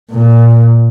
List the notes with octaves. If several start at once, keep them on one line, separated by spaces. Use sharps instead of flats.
A#2